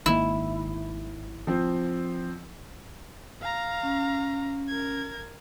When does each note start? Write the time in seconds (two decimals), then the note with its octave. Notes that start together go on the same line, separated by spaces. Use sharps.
0.06 G#1 D#3 A#3 E4
1.47 F3 C4
3.42 F5 A#5
3.83 C#4
4.69 A#4 G#6